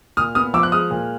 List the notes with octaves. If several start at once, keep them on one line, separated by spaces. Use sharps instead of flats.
A#2 D#6 F6
B3 D#6 F6
F3 D6 E6
F#6
G#3 D#6 F6
A#2